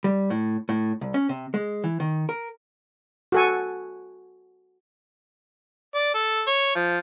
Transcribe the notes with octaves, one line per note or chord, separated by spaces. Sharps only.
G3
A2
A2
C2
C#4
C3
G#3
E3
D#3
A#4
F#4 A4 G#5
D5
A4
C#5
F3